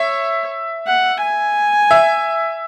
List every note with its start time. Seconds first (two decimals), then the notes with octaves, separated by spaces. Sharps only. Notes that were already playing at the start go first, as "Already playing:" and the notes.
Already playing: C#5 E5
0.87 F#5
1.22 G#5
1.91 E5